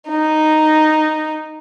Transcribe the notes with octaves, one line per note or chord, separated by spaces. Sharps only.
D#4